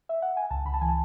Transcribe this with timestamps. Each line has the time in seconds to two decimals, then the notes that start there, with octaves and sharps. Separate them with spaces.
0.09 E5
0.22 F#5
0.37 G#5
0.51 C#2 A5
0.65 C#2 B5
0.74 A5
0.81 E3 G#5
0.89 A5